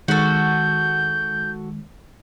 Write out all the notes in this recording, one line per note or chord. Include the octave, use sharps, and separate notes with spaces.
D#3 G#3 F#4 A4 G6